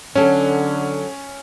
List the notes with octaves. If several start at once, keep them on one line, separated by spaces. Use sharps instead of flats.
D3 F#3 C#4 A4